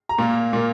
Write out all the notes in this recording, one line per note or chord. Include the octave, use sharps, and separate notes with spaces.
A#5
A#2 A#3
A#2 A#3